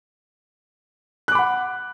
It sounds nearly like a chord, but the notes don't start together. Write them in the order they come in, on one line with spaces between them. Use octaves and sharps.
F#6 D6 B5 F#5